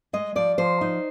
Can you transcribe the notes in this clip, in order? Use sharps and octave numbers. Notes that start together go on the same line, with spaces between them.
G#3 D#5
F3 D5
F3 C5
D#4